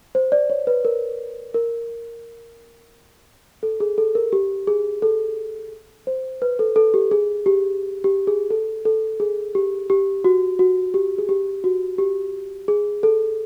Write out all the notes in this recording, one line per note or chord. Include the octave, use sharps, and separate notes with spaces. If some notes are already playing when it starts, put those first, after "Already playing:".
C5
D5
C#5
B4
A#4
A#4
A4
G#4
A4
A#4
G4
G#4
A4
C5
B4
A4
A4
G4
G#4
G4
G4
G#4
A4
A4
G#4
G4
G4
F#4
F#4
G4
G#4
G4
F#4
G4
G#4
A4